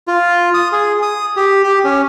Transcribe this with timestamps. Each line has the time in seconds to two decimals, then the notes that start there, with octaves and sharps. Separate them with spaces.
0.08 F4
0.54 D#6
0.72 G#4
1.02 D#6
1.36 G4
1.63 G4
1.85 C#4